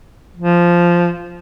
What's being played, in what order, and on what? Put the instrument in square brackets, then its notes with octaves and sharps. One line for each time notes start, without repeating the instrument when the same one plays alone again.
[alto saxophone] F3